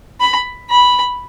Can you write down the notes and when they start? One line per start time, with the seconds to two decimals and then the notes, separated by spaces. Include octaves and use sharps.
0.21 B5
0.70 B5